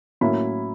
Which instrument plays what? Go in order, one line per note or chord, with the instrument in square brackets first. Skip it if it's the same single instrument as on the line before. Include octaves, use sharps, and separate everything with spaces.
[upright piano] A2 F#3 A#3 C#4 E4 B5